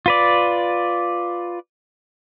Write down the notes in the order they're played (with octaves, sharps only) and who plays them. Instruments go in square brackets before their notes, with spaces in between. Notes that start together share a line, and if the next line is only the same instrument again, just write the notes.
[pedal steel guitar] F4 B4 D5